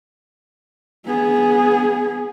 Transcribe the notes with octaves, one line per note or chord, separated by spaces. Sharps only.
B3 G#4